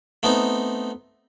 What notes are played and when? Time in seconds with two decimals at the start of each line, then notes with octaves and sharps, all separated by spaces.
0.23 A3 B3 C4 D#4